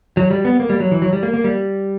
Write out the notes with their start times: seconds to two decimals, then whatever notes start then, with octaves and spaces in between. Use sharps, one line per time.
0.17 F#3
0.31 G3
0.45 B3
0.60 A#3
0.70 G3
0.80 F#3
0.91 E3
1.02 F#3
1.13 G3
1.23 A#3
1.34 A#3
1.44 G3